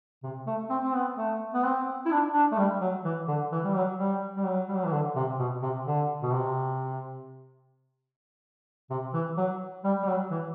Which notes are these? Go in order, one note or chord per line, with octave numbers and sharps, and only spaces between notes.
C3
A3
C4
C4
B3
A3
B3
C4
E4
D4
D4
A3
G3
F#3
E3
D3
E3
G3
F#3
G3
G3
F#3
G3
F#3
E3
D3
C3
B2
C3
D3
B2
C3
C3
E3
F#3
G3
G3
F#3
E3